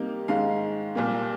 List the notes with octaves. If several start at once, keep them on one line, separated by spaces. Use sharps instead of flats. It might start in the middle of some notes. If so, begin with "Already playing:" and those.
Already playing: C3 G3 A#3 D#4
G#2 D#3 G#3 F5
C2 A#2 G3 A#3